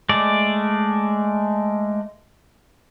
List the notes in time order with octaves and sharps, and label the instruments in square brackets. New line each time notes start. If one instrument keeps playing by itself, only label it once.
[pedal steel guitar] G#3 A3 D5